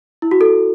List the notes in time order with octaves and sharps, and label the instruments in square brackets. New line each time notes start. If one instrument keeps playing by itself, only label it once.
[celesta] E4
F#4
A4